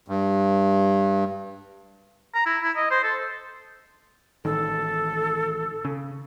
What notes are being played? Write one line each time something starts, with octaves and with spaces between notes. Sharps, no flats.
G2
A#5
E4
E4
D#5
C5
A4
A1 D#3 A4
C#3